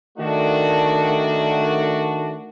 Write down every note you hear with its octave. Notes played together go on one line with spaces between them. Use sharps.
D#3 A3 D4 F#4